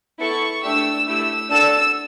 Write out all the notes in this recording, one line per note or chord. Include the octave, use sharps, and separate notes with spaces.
B3 E4 A4 C#6
A3 D4 G4 E6
A3 E4 G4 E6
D4 F#4 A4 E6